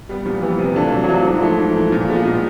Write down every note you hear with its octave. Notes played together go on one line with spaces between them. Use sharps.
G3 B3
A#2 F3
E3 G3 B3
C3
E3 A3 D4 F4
C3 F#3
F#3
E3 A3 D4 F4
F#3
G#2 F3
E3 A3
G#2
E3 A3
A#2
F3 G#3 B3
A#2